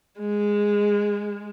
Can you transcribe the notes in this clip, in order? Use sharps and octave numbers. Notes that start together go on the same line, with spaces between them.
G#3